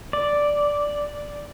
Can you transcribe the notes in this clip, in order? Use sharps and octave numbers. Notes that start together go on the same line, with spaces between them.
D5